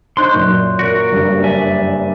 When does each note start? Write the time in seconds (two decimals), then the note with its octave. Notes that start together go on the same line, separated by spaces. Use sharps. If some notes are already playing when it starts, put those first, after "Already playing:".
0.17 D#4 C5 C6 C#6 F#6 G6
0.34 F#2 A#2 F#3
0.79 F#4 A#4
1.11 F#1 G2 A#3
1.44 D5 E5 G#5